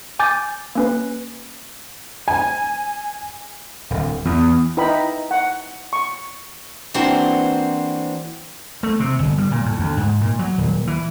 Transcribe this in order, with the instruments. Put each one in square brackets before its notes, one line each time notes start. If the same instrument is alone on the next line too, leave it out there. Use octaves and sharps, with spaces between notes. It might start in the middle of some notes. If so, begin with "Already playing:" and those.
[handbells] G#5 D6 G6 A6
A#3 C#4 B4
[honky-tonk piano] G#5
[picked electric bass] D1
E2
[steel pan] D#4 E4 B4 D#5 G5 B5
F#5
C#6
[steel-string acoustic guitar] E3 A#3 C4 D4 F#4 C5
[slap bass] A3
C3
G1
G3
A#2
A2
D2
G#2
A#2
F#3
D#1
E3